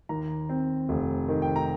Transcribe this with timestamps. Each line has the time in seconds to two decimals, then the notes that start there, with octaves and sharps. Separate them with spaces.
0.09 D#2 A#5
0.49 C4
0.89 F1
1.28 D#3
1.42 G5
1.56 A#5